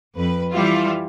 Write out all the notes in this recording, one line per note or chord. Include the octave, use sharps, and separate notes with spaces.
F2 B4
E3 G3 E4 F4